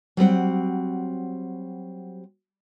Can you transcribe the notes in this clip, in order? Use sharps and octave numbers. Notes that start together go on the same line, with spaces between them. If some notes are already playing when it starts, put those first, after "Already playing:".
F#3 G3 C4 F#5